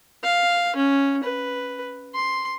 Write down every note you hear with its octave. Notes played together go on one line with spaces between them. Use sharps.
F5
C#4
B4
C6